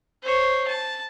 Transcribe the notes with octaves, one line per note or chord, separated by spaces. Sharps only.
C5 C#5
A5